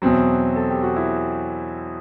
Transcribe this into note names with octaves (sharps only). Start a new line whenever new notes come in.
E2 B2 F#3 C4
A4
G4
F#4
E4